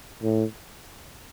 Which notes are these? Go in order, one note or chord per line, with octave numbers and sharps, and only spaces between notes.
A2